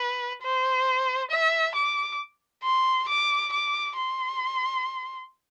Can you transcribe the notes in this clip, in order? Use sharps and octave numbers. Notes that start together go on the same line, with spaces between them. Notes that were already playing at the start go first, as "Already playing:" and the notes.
Already playing: B4
C5
E5
D6
C6
D6
D6
C6